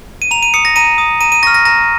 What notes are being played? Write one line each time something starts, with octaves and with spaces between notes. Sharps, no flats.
D#7
A#5 F7
D#7
D#6 C#7
A#6
A#5 D#7
D#6
A#5 D#7
D#7
C#6 F6 A#6
A#6
A#5 A#6